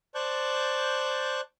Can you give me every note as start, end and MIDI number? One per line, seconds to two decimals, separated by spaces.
0.15 1.41 72
0.15 1.41 74
0.15 1.41 81
0.15 1.41 85
0.15 1.41 90
0.15 1.41 91